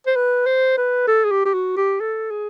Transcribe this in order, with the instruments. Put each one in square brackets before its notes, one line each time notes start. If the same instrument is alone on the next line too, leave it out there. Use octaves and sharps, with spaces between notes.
[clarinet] C5
B4
C5
B4
A4
G#4
G4
G4
F#4
G4
A4
G#4